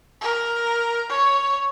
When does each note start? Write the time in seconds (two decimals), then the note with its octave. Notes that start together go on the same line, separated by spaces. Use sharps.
0.21 A#4
1.10 C#5